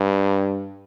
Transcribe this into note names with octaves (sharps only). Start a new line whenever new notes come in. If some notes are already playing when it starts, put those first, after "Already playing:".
Already playing: G2